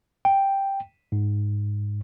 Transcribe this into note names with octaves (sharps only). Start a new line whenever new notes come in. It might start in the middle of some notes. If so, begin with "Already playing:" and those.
G5
G#2